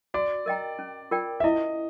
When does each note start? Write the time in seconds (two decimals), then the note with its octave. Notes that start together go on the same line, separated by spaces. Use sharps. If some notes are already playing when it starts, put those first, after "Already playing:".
0.14 F#4 D5
0.46 A#4 D#5 G5 A#5
0.79 C#4
1.11 F4 A#4 D5 G5
1.40 E5
1.44 E4 D#5